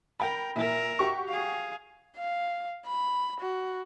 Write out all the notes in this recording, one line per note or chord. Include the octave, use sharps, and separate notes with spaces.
A#4 G5 B5
A#2 E4 A#4 E5
F#4 G4 C#6
G#4 F5
F5
B5
F#4